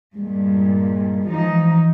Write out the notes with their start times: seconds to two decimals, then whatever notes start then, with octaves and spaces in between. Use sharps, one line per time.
0.17 G2 A#2 G#3
1.29 E3 F3 D#4